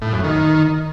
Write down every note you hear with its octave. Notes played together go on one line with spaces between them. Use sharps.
A2
F#2
D#3